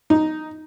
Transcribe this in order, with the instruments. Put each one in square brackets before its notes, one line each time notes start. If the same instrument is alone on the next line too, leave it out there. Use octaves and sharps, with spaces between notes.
[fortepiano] D#4